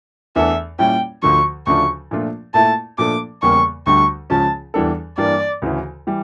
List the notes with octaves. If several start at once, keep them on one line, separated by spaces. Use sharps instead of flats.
E2 E3 A3 D4 A4 E5
A#2 G3 C#4 E4 G5
D2 D3 F3 C#6
D2 C#3 F3 A3 D4 C#6
A#2 F3 A3 D4 F4
A#2 A3 E4 A5
A#2 F3 A3 D4 A4 D6
E2 C#3 G3 A#3 C#6
D2 D3 G3 D4 C#6
C#2 C#3 F3 C#4 F4 A5
E2 E3 G3 D4 A4
G2 E3 G3 A#3 D4 D5
D2 C#3 E3
E3 G3